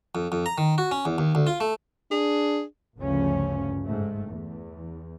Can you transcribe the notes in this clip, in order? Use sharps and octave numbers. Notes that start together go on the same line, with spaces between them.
F2
F2
A#5
D#3
F#4
C#4
E2
D#2
D2
F4
A3
D4 G#4
G1 D2 G2 C#3 F3 C#4
G#2 A3
E2